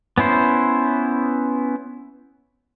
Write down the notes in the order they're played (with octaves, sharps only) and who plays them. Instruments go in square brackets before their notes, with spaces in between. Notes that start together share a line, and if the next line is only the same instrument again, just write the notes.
[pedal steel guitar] B3 C#4 E4 C5